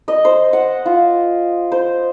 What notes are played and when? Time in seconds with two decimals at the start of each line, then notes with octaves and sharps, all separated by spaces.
0.08 D#5
0.25 C5
0.53 F#5
0.86 F4
1.72 C5